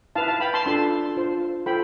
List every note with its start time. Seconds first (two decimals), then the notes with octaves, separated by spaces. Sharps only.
0.15 E4 B4 F5 A5
0.28 F5 A5
0.40 G5 B5
0.54 A5 C6
0.66 D4 F4 A4 A5 C6
1.17 F4 C5
1.66 F4 A4 C5 G5 B5